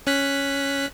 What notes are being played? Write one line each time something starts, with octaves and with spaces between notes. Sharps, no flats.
C#4 F#6 B6